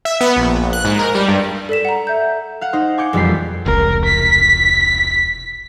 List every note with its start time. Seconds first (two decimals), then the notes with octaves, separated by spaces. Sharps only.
0.05 E5
0.21 B3
0.36 A#1
0.73 F#6
0.85 G#2
0.99 A#4
1.15 G3
1.28 G2
1.69 A4 D5 B6 E7
1.85 F#5 A#5
2.07 A4 E5 G6
2.61 F5 F#5
2.73 D#4 C5
2.98 G#5 D6 G6 C#7
3.13 E1 F2 G3 A#3 B5 C7
3.66 E1 C2 A#4
4.05 B6